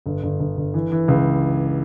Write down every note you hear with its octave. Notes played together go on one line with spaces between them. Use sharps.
G1
G1
G1
G1
E3
E3
C#2